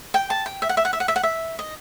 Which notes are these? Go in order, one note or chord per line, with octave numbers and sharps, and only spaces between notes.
G5
A5
G5
E5
F#5
E5
F#5
E5
F#5
E5
F#5
E5
D#5